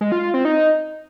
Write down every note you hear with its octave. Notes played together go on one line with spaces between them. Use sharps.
G#3
F4
F4
C4
D#4